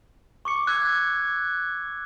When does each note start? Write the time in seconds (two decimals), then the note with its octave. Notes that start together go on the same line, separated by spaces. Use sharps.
0.45 C#6 D6 C#7
0.67 D6 E6 F#6 G#6